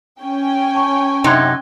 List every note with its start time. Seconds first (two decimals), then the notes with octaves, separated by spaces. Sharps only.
0.22 C#4 G5 G#5
0.74 A5 C#6
1.24 F#2 C3 D#4 C6 F#6 G#6